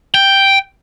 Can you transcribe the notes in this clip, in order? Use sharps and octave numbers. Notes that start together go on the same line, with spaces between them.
G5